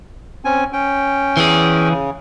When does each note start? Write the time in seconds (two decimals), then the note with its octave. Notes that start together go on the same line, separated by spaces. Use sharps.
0.45 C4 C#4 G#5
0.73 C#4 G5
1.37 E3 G#4
1.89 C#3